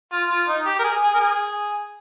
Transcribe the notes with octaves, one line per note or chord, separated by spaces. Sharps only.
F4
F4
D#4
G4
A#4
G#4
G#4
A#4
G#4